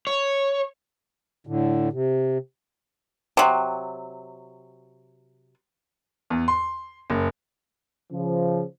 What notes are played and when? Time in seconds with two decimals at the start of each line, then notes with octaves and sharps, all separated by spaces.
0.07 C#5
1.47 A2 D3
1.92 C3
3.37 C3 F#3
6.30 E2
6.48 C6
7.10 F#1
8.12 C#3 F3